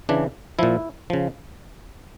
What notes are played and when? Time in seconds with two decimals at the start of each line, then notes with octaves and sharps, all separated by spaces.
0.09 C#3 E3 D4
0.59 A#2 F3 E4
1.10 C#3 F3